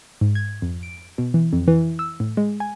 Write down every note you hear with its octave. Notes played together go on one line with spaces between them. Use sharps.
G#2
G#6
F2
D7
B2
E3
F2
E3
E6
A2
G#3
G#5